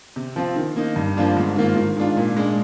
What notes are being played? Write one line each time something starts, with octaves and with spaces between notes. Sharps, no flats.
C3
F3 C4 F4
D#3
A#3 D#4
G2
F3 A#3 D4 F4
G#2
D#3 A#3 F4
D#3
G#3 D4 F4
A#2
G#3 D4